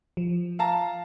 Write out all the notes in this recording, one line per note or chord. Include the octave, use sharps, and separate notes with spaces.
F3
F5 A5 A#5